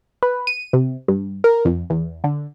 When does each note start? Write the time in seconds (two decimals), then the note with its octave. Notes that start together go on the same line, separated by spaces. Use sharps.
0.23 B4
0.47 D#7
0.73 C3
1.08 G2
1.44 A#4
1.65 F2
1.90 E2
2.24 D3